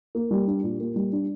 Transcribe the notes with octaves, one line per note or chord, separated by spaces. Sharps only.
A#3
G3
D4
A#2
A#3
G3
D4